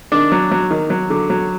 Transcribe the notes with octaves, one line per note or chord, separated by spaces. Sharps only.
D#3 D4
F#3
F#3
D#3
F#3
D3
F#3